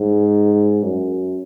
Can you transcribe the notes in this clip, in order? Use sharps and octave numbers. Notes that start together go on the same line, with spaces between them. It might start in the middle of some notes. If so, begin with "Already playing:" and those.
Already playing: G#2
F#2